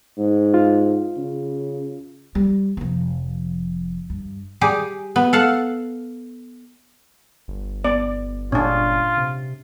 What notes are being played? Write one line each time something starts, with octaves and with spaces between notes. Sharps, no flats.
G#2
F4
C#3
G3
F1 F3
G2
G3 G4 G#4
B3
A4 F5 F#5
G1
B3 D5
A#2 C#4 D4 F4
C3